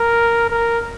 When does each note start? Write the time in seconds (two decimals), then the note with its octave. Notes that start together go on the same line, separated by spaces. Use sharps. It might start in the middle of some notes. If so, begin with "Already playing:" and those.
Already playing: A#4
0.50 A#4